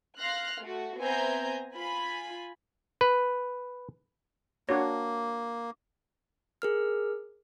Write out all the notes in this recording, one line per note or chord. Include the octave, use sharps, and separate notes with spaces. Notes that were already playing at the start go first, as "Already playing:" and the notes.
F5 C6 F6 F#6 A#6
A3 F#4
B3 C4 E5 G#5 A#5 G6
F4 G#5 B5
B4
A#3 D4 F#4 C#5
G#4 A#4 F6